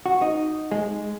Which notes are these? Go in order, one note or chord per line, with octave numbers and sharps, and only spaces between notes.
F#4
D#4
G#3